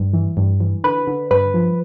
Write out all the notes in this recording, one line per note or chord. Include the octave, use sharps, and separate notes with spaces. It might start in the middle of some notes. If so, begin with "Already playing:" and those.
Already playing: G2
E3
G2
E3
D3 B4
D3
G2 B4
F3